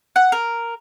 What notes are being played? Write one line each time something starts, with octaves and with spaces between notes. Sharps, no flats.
F#5
A#4